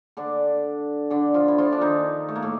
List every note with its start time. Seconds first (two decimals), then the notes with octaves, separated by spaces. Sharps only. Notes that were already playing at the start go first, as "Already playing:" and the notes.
0.17 D3 D4
1.10 D3 D4
1.34 F3 F4
1.48 E4
1.58 F3 F4
1.72 D4
1.81 D#3 D#4
2.29 A3
2.35 A#3
2.42 A2 A3